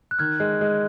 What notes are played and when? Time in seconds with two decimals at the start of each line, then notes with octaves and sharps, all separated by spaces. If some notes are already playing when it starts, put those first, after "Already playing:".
0.11 F#6
0.19 D#3 F6 G#6
0.40 G#3
0.61 G#3